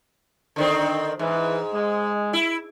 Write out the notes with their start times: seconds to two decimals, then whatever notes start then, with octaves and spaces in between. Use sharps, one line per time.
0.56 D3 D#3 C4
1.19 G#2 E3
1.74 G#3
2.33 E4